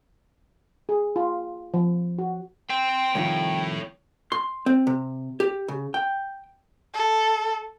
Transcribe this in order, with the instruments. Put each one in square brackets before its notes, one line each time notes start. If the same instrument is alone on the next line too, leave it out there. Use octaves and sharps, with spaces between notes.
[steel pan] G#4
F4
F3
F#4
[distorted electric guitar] C4 [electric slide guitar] G5
[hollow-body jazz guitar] C2 F2 D#3 [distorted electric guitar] A2
[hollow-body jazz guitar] C6
C4
C3
G4
C#3
G5
[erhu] A4